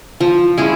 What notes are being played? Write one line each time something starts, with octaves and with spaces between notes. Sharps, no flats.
F3
G#3 C#4 E4